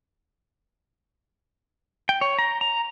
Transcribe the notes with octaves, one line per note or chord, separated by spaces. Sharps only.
G5
C#5
A#5
A#5